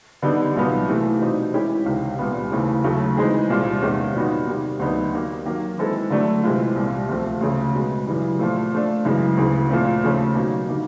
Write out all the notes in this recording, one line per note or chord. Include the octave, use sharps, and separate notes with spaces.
D3 G3 B3 D#4
C2 A#2 F#3 B3 D#4
C3 E3 A3
B2 G3 C4 D#4
E3 G#3 C#4 E4 G4
C#2 C3 D#3
C2 A#2 G3 B3
D#2 C#3 E3 A3 C4
D#2 C#3 F#3 A3
E3 G#3 C4 D#4 G#4
C2 A#2 G3 C4 F4
E2 C3 D#3 G#3 C#4
A#2 G3 B3 D#4 F#4
C3 D#3 G3 A#3
D2 D3 F#3 B3 D#4
D#3 G3 A#3
D#3 F#3 A#3
E3 G#3 C4 E4 A4
D3 F#3 A3 D4
C3 E3 G#3 C4 F4
C2 A#2 G3
D2 C3 F3 A3
D2 C#3 F3 A3 C#4
B2 G#3 B3
F#2 C#3 E3 G3
A#2 F3 A3
F3 A3 D4
F#2 C#3 E3 G#3
D2 C#3 E3
A#2 F3 A3 C4
D#2 C#3 F3 A3 C#4
B2 F#3 A#3 D#4
D3 G3 A#3 D#4